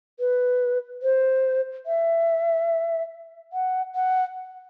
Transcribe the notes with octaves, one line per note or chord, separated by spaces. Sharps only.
B4
C5
E5
F#5
F#5